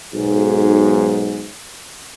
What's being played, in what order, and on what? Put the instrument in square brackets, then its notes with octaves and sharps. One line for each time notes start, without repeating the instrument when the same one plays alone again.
[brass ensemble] B1 G#2